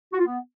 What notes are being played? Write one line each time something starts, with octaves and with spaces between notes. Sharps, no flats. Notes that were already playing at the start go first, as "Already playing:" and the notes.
F#4
F4
B3